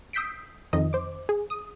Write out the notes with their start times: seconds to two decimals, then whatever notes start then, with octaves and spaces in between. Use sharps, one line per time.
0.13 D#6 E6 G6 B6 C7 D7
0.73 F2 D#3 D#5
0.93 C5 D6
1.29 G#4
1.50 D#6